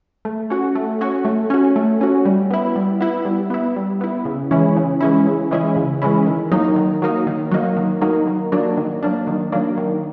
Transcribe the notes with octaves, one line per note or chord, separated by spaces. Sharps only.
A3
C#4 F#4
A3
C#4 F#4
A3
C#4 F#4
A3
C#4 F#4
G3
B3 E4
G3
B3 E4
G3
B3 E4
G3
B3 E4
C#3
E3 G#3 C#4 E4
C#3
E3 G#3 C#4 E4
C#3
E3 G#3 C#4 E4
C#3
E3 G#3 C#4 E4
D#3
F#3 A#3 D#4
D#3
F#3 A#3 D#4
D#3
F#3 A#3 D#4
D#3
F#3 A#3 D#4
D#3
F#3 A#3 D4
D#3
F#3 A#3 D4
D#3
F#3 A#3 D4
D#3